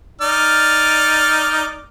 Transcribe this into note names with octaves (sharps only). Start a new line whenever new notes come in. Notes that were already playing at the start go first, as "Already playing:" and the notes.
D#4 D5 F6